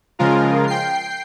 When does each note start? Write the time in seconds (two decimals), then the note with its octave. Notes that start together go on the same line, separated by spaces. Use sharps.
0.19 C#3 F3 G#3 F4 A#4
0.67 G5 C7